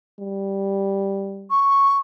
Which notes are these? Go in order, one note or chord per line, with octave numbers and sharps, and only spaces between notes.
G3
C#6